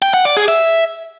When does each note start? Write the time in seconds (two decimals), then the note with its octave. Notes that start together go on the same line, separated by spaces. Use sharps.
0.02 G5
0.14 F#5
0.25 D5
0.37 G#4
0.48 E5